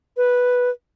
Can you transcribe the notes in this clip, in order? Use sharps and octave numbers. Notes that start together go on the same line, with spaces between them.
B4